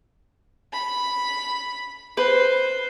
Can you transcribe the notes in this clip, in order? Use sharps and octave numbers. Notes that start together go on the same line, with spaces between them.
B5
B4 C5